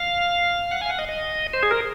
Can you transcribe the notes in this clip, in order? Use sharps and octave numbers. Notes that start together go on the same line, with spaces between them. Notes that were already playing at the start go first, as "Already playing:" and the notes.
Already playing: F5
F#5
F5 G#5
F#5
D#5
D#5
C5
G#4
A#4